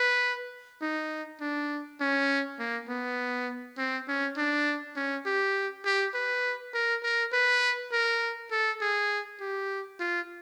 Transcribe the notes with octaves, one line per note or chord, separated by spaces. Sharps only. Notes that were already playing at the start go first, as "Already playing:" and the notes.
Already playing: B4
D#4
D4
C#4
A#3
B3
C4
C#4
D4
C#4
G4
G4
B4
A#4
A#4
B4
A#4
A4
G#4
G4
F4